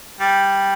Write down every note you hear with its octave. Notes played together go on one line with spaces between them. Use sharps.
G3